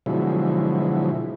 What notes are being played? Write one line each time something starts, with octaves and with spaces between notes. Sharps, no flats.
B2 D3 F3 F#3 G#3 E4